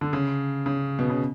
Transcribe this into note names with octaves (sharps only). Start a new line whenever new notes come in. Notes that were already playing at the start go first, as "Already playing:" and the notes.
D3
C#3
C#3
B2
C#3